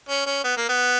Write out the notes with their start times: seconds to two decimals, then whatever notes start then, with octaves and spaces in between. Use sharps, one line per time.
0.09 C#4
0.26 C#4
0.44 B3
0.57 A#3
0.69 B3